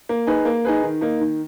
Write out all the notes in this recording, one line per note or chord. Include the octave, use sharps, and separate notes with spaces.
A#3
D#4 G#4 B4
A#3
D#4 G#4 B4
D#3
A#3 D#4
D#3